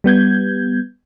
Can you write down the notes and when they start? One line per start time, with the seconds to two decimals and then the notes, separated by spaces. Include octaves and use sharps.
0.04 G3 B3 G6 G#6